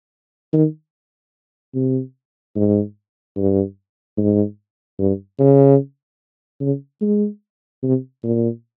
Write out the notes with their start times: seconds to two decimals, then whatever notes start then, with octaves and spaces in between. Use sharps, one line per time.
0.53 D#3
1.75 C3
2.56 G#2
3.37 G2
4.18 G#2
4.99 G2
5.39 C#3
6.61 C#3
7.02 G#3
7.83 C3
8.24 A#2